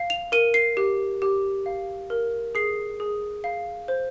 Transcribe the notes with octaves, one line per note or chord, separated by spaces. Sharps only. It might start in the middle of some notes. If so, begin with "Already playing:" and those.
Already playing: F5
F7
A#4 D#7
C7
G4
G4
F5
A#4
G#4 C7
G#4
F5
C5